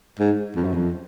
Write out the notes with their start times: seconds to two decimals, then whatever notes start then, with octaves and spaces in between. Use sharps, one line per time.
0.20 G#2
0.56 F2
0.65 F#2
0.74 F2